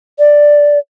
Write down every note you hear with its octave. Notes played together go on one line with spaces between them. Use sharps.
D5